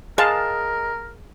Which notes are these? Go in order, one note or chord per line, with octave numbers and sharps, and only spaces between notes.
G#3 G#4 A#4 F5 A5